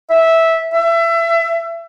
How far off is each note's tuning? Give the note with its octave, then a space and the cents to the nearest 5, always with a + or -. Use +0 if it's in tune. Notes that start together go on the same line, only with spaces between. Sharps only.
E5 -10
E5 +25